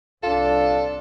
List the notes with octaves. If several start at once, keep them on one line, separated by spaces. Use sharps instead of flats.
C2 D4 F4 A4